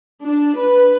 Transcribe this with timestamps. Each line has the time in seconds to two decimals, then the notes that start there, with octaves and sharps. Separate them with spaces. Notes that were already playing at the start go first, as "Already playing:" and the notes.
0.23 D4
0.58 B4